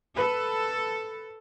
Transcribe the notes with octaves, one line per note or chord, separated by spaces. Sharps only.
A4 B4